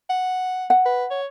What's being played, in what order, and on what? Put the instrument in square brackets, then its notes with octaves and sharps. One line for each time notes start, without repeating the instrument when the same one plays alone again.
[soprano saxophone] F#5
[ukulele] F#5
[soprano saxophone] B4
C#5